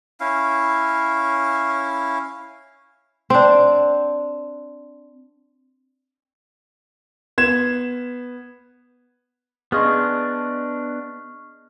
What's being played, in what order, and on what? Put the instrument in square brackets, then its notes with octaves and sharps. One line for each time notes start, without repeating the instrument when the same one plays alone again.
[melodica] C#4 E4 F5
[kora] C4 D4
[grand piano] B3 G#6 E7
[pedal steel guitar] B3 D4 [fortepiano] G#4 D#5 C6 [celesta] C#6 F6